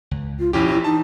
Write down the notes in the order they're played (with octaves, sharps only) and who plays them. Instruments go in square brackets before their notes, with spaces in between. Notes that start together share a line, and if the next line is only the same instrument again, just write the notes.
[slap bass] C#2
[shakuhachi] F4
[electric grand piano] A#1 C#4 G4 [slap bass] E2 E3 [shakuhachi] E4
[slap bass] E3 [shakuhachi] E4
[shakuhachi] D#4 [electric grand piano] A5